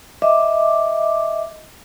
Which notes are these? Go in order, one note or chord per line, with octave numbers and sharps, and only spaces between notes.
D#5 E5 D6